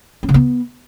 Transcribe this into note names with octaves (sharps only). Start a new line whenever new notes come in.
C#4
C#3
B3